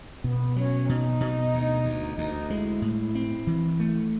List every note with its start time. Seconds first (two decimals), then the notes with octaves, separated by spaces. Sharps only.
0.24 B2 B3
0.56 F#3 C#4
0.88 B2 D#4
1.21 B2
1.54 D2
1.85 D2
2.18 D2 D#4
2.50 G#3 E4
2.82 A2
3.15 C4
3.47 E3
3.80 A3